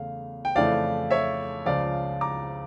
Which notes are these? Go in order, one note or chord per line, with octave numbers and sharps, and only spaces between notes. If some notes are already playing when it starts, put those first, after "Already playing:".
Already playing: E2 C#3 A3 F5
G5
F2 C#3 E3 A3 D5 F5
C#5 E5
C#2 C#3 F3 D5 F5
A#5 D6